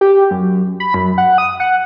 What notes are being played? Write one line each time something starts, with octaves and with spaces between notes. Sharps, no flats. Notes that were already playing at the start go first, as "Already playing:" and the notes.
G4
F#2
B5
F#2
F#5
D#6
F#5